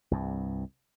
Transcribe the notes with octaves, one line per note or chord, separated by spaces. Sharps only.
C2 G2